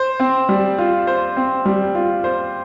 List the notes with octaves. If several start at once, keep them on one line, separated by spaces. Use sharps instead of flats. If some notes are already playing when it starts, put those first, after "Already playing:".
Already playing: C5
C4
G3
F4
C5
C4
G3
F4
C5